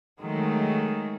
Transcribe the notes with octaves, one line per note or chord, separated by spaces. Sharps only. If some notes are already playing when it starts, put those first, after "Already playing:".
D#3 F#3 G#3 A3